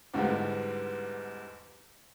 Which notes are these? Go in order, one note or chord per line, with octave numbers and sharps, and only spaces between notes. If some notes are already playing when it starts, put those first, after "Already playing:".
E2 G#2 D3 G3 G#3 B3